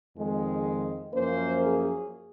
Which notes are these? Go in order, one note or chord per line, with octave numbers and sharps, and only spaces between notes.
F2 D#3 G#3
F#2 F3 A#3 C#4 C5
G#4